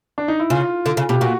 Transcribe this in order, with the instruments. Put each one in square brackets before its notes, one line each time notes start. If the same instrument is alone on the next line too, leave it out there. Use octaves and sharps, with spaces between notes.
[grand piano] D4
D#4
E4
[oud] C#3 [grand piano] F4
[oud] D3
C#3
[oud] B2 [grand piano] G4
[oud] A#2 [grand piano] F#4